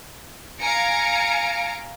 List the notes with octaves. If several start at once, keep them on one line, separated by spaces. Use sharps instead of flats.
F5 G#5 A#5 A#6 C#7 D7